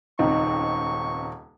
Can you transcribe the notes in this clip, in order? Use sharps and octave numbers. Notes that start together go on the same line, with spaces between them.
D#1 C#2 C4 D#4 C#6